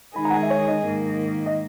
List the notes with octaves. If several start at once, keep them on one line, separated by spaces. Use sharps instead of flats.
D#3 G#3 D#4 G#4 B5
A#5
F#5
G#5
E5
C#5
D#5
G#2 D#3 A#3
D#5